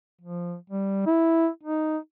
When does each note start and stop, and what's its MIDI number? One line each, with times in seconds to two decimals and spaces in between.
0.21 0.55 53
0.70 1.04 55
1.07 1.48 64
1.63 1.98 63